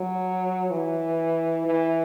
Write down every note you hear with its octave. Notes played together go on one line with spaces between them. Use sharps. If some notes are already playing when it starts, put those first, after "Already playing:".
Already playing: F#3
E3
E3